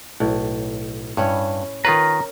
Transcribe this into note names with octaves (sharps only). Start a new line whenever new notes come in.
B1 A2
G2 C#4 E4 C#5
D#3 F4 A#4 B4 C#5 A#5